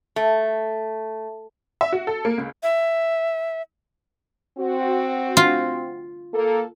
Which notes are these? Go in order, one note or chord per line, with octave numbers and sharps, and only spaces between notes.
A3
E5
F#4
A4
A#3
C#2
E5
C4 F#4
F4
A#3 A4